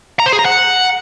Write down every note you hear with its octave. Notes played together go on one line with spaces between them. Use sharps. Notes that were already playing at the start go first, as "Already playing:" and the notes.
A#5
C5
G#4
A#5
F#5